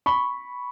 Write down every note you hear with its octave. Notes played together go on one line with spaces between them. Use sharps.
B5 C#6